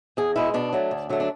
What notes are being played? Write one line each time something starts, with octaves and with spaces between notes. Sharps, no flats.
E2 G#4
B2 G#3 E4
B2 D4
F#3 A3
D2
D3 F#3 A3
D4